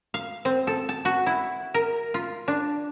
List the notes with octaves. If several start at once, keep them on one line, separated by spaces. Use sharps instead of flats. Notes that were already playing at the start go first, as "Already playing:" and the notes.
F5
C4
A4
A5
F#4
E4
A#4
F4
D4